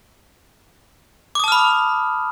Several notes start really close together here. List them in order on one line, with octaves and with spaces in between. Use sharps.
D6 D#6 A5 F6 B5